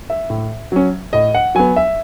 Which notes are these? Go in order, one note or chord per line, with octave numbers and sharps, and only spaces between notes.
E5
A2
F#3 C#4
A2 D#5
F#5
F#3 B3 G#5
E5